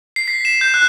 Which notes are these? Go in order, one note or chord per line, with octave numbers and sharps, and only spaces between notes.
C7
B6
E7
G6
F#6